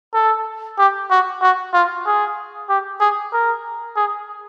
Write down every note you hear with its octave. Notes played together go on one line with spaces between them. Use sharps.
A4
G4
F#4
F#4
F4
G#4
G4
G#4
A#4
G#4